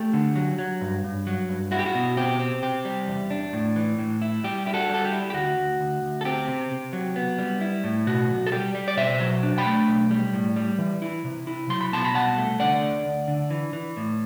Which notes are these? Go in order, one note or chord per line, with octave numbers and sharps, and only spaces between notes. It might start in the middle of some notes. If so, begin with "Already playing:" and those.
Already playing: A3 G4
D3
F#3
F#3
G2
G2
F#3
G2
E4 F#4
G4
F#4
B2
C4 G4
C4
C3 G4
G3
E2
D4
A2
E3
A2
E4
G3 G4
E4 G4
F#4 A4
G3 A4
G4
E4
G4
D2 F#4
D2
D2
D2
A4
C4 G4
C3
C3
F#3
B3
G3
E4
A2
B2 F#4
B1
A4
G3 G4
G3
D5
B2 C5 E5
F#3
D4
G5 B5
A3
B1
G3
A2
G3
E3
E4
C3
E4
F#3 C6
B5
B2 A5 C6
B5
C2 F#5 A5
A3
D3 D5 F#5
D2
D2
D3
E3
E3
A2